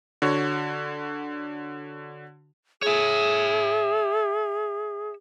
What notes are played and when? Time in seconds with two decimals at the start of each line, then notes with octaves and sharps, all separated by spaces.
0.22 D3 F#4 C#5
2.82 G#4 C#5 E5